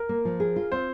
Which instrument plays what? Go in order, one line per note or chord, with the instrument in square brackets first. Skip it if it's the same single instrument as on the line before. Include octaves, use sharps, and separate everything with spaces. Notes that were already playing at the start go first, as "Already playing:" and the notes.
Already playing: [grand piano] A#4
[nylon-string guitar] A#3
F3
G#4
F4
[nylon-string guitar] C4 [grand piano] C5